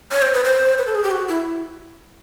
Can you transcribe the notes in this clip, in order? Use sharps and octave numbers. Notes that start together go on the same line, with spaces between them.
C#5
C5
B4
C5
B4
A4
G#4
G4
F#4
E4